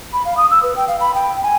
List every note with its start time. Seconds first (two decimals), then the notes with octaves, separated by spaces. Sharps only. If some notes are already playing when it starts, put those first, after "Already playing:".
0.13 B5
0.25 F5
0.37 D#6
0.51 E6
0.63 B4
0.76 G5
0.88 F5
1.00 B5
1.15 G5
1.43 G#5